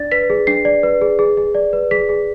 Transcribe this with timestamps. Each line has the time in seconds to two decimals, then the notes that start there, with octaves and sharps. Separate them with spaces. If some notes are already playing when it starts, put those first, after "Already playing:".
Already playing: D4 D5 A6
0.12 B4 B6
0.30 G#4
0.47 D4 C7
0.65 D5
0.83 B4
1.01 G#4
1.19 G#4
1.37 G#4
1.55 D5
1.73 B4
1.91 G#4 B6
2.09 G#4